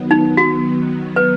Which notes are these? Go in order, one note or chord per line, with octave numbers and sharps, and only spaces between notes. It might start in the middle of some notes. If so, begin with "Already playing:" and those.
Already playing: D#3 F#3 B3
D#4
F#4
B4